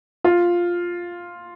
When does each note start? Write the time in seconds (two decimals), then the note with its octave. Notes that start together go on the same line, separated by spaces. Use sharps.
0.24 F4